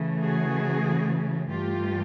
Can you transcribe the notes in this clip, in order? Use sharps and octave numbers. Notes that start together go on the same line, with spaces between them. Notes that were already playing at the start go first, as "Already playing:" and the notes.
Already playing: C#3 E3 A3
F#4 G#4
G2 E3 A3 F4 G4